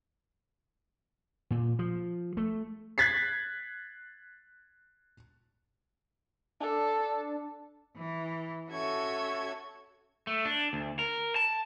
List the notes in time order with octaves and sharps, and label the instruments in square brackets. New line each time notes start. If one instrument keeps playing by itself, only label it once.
[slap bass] A#2
F3
A3
[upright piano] F#6 G#6 A6 B6 C7
[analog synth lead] D4 [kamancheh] A4
[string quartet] E3
C#4 F#4 A4 E5 C#6 G#6
[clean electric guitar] A3
D4
D2
A#4
A5